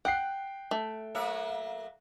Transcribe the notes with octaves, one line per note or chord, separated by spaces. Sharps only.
F#5 G5 F#6 C7
A3
F#3 A#3 E5